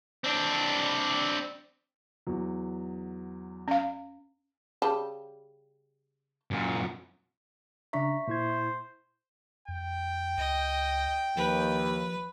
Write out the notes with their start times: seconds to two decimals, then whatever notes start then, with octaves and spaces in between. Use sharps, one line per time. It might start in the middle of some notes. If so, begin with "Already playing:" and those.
0.24 C4 D4
2.27 E2 F#3
3.68 C#4 F5
4.82 C#3 G3 A5
6.51 F#2 A#2
7.93 C#3 D4 E5 A#5 C#6 B6
8.28 A#2 E4 C5 G#6
9.68 F2 G5
10.38 C#2 D#5
11.37 D#2 F3 B4